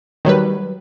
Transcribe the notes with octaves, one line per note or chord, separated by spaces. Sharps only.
D#3 F#3 G3 B4